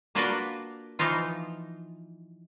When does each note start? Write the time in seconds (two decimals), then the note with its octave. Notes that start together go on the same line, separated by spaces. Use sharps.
0.15 A#3 D4 F4 F#4 A#4 B4
0.99 E3 F3 D#4 F4